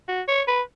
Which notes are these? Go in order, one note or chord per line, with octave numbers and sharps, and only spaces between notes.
F#4
C#5
B4